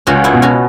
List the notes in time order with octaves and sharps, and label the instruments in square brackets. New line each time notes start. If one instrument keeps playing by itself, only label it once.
[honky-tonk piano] C#2 [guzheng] C#4 F#4
[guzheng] B3 E4
[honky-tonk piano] B2
[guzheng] C#4 F#4